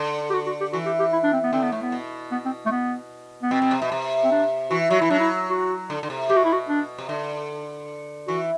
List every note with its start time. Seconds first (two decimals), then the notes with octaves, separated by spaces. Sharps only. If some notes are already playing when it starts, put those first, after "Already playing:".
Already playing: D3
0.30 G4
0.34 F#4
0.47 F#4
0.60 G4
0.73 E3 F#4
0.86 G4
0.99 G4
1.13 E4
1.23 D4
1.33 C4
1.43 B3
1.53 D3 C4
1.63 B3
1.72 A2 A3
1.82 B3
1.92 B2
2.32 B3
2.45 C4
2.66 A3
2.71 B3
3.43 B3
3.51 B2 C4
3.62 B2
3.71 C3
3.82 B2
3.92 C3
4.24 C4
4.31 D4
4.71 E3 F#4
4.90 F#3 F#4
5.01 E3 E4
5.10 F#3 D4
5.19 E4
5.50 F#4
5.90 D3
6.03 D3
6.10 C3
6.30 B2 G4
6.37 F#4
6.45 E4
6.53 F#4
6.69 D4
6.98 C3
7.09 D3
8.27 E3 F#4